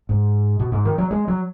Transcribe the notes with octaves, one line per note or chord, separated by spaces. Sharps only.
G#2
B2
G#2
D#3
F#3
G#3
F#3